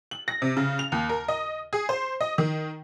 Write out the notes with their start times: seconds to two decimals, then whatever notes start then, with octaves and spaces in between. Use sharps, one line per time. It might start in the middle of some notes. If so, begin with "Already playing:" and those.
0.11 F#7
0.28 A#6
0.42 C3
0.57 C#3
0.79 F7
0.92 D#2
1.09 A#4
1.28 D#5
1.73 G#4
1.89 C5
2.21 D#5
2.38 D#3